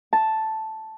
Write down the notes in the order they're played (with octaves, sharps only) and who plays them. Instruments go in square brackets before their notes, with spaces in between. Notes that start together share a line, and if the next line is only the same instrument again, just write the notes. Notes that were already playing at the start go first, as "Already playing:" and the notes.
[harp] A5